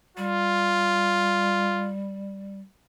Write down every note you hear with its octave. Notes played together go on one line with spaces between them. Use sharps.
G3 F4